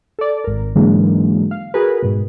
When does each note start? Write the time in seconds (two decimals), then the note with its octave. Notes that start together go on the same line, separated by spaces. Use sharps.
0.19 A4 D5
0.44 G#1 A#4
0.75 G#2 D3 E3 F#3 G#3 A#3
1.51 F5
1.74 F#4 G#4 A#4 B4
2.02 G#2 B2